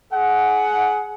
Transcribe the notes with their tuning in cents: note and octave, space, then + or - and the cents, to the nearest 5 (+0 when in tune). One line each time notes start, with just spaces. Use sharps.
G#4 +25 F#5 +0